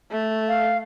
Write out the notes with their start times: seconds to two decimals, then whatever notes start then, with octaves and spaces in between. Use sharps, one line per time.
0.11 A3
0.48 F5